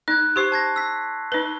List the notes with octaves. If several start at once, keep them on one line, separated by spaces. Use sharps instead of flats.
D#4 F#6 G#6
G4 C5 C6 C#6 C7
A5 G#6 A#6
E6 B6
D#4 B4 G7